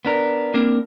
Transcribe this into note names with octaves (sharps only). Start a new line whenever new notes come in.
B3 D4 A#4
A#3 C4 D4 A#4